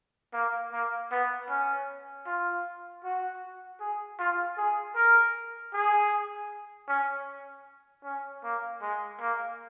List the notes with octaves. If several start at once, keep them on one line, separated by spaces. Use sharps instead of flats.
A#3
A#3
B3
C#4
F4
F#4
G#4
F4
G#4
A#4
G#4
C#4
C#4
A#3
G#3
A#3